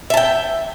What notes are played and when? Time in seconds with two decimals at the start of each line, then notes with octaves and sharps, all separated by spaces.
0.10 E5
0.14 A5
0.17 G5